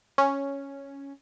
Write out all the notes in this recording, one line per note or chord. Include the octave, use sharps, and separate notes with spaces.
C#4